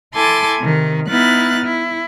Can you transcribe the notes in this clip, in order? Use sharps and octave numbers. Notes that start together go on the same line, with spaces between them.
E4 A4 G#5 A5 C6 D6
C3 D#3
B3 D#4 E4 F6 F#6 A6
E4